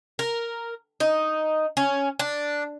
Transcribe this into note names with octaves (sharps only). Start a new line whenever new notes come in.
A#4
D#4
C#4
D4